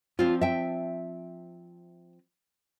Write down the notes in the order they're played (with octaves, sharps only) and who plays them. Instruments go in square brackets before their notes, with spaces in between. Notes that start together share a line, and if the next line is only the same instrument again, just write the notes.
[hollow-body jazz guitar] F3 C4 D4 [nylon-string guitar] F4
[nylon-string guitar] E5 G5